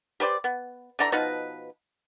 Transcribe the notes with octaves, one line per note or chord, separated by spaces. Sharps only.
G4 B4 C5 D5
B3
D3 E3 D5 A#5
B2 F3 D#4 B4